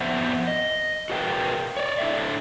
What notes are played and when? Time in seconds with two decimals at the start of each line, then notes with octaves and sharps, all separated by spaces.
0.01 F2 B3 C5 E5 F#5
0.48 D#5
1.10 F#4 G#4 A#4 B4 F5 G5
1.77 C#5 D5
1.99 D4 E4 F#4 A4 C#5 E5